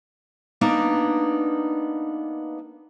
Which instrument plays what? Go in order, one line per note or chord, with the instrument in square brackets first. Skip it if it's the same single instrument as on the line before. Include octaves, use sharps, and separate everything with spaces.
[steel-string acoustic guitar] A#3 B3 D4 D#4